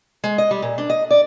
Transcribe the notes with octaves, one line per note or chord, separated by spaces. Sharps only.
G#3
D#5
G3
A#2
D4
D#5
D5